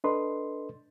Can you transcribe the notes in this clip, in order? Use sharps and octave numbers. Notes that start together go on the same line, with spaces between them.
D4 A4 B4 D#5 C6